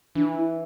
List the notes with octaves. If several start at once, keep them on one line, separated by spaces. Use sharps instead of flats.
E3 D4
E4